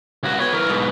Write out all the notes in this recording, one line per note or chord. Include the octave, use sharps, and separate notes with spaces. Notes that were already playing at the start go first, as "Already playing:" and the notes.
C#2 F#4
B3 C#5
E3 A#4
G#2 B2